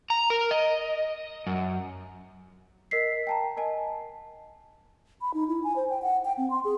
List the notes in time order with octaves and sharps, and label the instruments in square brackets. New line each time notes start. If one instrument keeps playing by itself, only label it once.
[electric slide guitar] A#5
A#4
D#5
F#2
[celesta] A#4 D#5 B6 C7
G5 A5 A#5
A#4 D#5 G#5 A5
[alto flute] B5
D#4
E4
G#5
C5
G5
F#5
G5
C4
C6
G#4